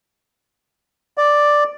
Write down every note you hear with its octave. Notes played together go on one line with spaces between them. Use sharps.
D5